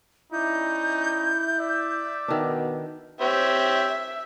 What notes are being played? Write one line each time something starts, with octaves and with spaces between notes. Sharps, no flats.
C#4 D#4 E4 D5 G6
D5 E5
B2 D#3 D4
C4 G4 C#5 E5